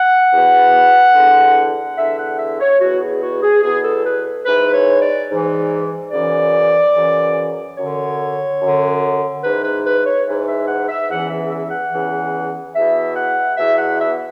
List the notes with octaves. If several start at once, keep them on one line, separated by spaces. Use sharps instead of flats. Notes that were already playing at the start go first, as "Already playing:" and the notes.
Already playing: F#5
E2 B2
E2 D3
E2 D3 E5
F#5
E5
C#5
E2 B2 F#4
G#4
F#4
G#4
E2 B2 G#4
A4
B4
G#2 E3 B4
C#5
D5
G#2 E3
F#2 C#3 E3 D5
F#2 C#3 E3
F#2 D3 C#5
F#2 D3
G#2 E3 B4
B4
B4
C#5
G#2 E3
E5
F#5
E5
E2 C#3 E3 F#5
E5
E5
F#5
E2 C#3 E3
E2 B2 E5
F#5
E2 B2 E5
F#5
E5